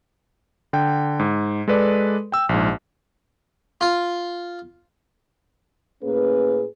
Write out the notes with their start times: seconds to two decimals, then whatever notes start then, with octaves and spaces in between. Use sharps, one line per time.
0.73 D3 G5
1.19 G#2
1.68 G#3 A4 B4 D5
2.32 G5 E6
2.49 A#1 G#2
3.81 F4
6.04 A2 A#3 C#4 G#4 B4